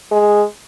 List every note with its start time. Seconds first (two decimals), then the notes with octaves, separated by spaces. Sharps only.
0.12 G#3